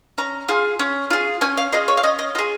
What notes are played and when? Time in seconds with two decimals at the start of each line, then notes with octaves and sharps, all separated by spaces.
0.18 C#4 A#5
0.48 F4 G#4
0.79 C#4
1.10 F4 G#4
1.41 C#4 G#5
1.57 F5
1.72 F4 G#4 D#5
1.88 C#5
1.97 F5
2.03 C#4 D#5
2.19 D#5
2.35 F4 G#4 D#5